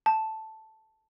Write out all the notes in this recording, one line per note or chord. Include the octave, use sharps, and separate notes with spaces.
A5